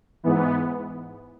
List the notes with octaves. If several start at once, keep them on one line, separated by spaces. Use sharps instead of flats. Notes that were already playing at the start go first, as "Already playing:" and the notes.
G#2 E3 B3